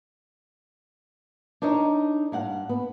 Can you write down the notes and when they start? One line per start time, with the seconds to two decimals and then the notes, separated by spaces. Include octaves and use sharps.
1.62 D4 D#4 A#4 C#5 D#5
2.32 G2 F5 F#5
2.69 B3